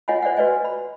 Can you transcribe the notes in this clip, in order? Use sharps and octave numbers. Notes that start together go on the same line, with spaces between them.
F4 C#5 D#5 F#5 G#5 B5
C5 D5 E5 F#5
F#4 B4 D5 D#5 G#5
B5